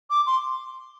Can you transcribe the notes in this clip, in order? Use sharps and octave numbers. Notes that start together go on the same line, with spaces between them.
D6
C6